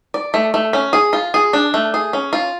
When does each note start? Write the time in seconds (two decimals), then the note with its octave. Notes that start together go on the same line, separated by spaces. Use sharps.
0.14 D5
0.34 A3
0.54 A3
0.73 C#4
0.93 G#4
1.13 F4
1.34 G#4
1.53 D4
1.74 A3
1.94 G#4
2.13 C#4
2.33 F4